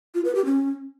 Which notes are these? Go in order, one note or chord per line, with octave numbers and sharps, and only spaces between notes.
F4
B4
G4
C#4